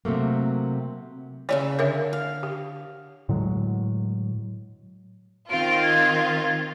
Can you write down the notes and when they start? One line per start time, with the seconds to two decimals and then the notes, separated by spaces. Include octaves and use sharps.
0.05 C3 F#3 A3 A#3
1.49 C#3 C#5 D5 E5 F5
1.79 D3 A#4 C#5 E5
2.13 F5
2.43 G4
3.29 A2 D3 F#3 G#3
5.50 D#3 C4 F4 D7
5.83 G#6